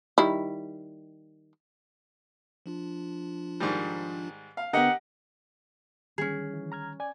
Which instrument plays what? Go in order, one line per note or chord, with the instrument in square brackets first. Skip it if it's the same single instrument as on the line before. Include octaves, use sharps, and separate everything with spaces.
[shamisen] D#3 G3 E4
[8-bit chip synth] F3 D4 F4
[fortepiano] G#2 D#3 G3
F5
[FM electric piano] D3 B3 [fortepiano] G4 A#4 D#5 [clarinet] F#5
[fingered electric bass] D3 D#3 G3 [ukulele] C#4 G#4
[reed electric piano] E3
A#5 F6 G#6
D5 G#5 G#6